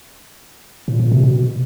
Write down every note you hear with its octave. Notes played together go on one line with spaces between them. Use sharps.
A#2
A#2
C3
B2